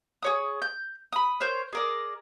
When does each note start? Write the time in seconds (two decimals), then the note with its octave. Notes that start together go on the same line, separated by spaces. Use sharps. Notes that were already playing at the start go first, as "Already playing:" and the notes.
0.23 G#4 C#5 D#6
0.62 G6
1.12 B5 D#6
1.40 A#4 C5 C#5 G6
1.73 G#4 A#4 D5